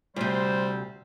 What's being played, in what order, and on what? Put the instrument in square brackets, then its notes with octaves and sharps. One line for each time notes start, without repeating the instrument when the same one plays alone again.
[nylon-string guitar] D2 C3 [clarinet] G3 [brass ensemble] C5